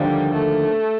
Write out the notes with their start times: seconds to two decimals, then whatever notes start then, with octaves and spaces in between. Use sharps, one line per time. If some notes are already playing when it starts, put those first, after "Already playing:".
Already playing: D#2 D3 F3 G3 A#3
0.34 A3